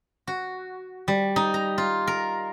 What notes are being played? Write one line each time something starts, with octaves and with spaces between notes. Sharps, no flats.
F#4
G3
D#4
A#5
F4
A#4